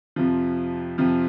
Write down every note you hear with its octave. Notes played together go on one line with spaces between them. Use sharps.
F2 C3 F3
F2 C3 F3